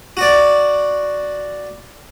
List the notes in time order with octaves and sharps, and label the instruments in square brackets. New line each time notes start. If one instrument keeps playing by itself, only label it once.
[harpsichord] F#4 D5